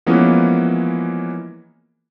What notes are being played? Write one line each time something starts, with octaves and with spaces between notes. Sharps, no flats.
E3 F3 G#3 A#3 B3 C#4